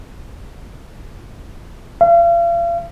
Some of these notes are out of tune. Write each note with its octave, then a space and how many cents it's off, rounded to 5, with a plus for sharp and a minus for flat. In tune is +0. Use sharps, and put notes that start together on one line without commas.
F5 -40